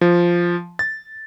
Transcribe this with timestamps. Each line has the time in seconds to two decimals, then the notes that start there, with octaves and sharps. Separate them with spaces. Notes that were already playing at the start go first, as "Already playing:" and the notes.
0.01 F3
0.79 A6